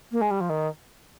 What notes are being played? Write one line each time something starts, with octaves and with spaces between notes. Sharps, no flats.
A#3
G#3
G3
F3
D#3